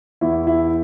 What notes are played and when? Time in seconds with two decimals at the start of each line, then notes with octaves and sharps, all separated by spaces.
0.21 E2 E3 E4
0.47 E4